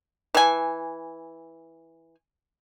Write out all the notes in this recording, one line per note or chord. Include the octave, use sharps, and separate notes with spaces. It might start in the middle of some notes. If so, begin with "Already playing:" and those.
E3 G#5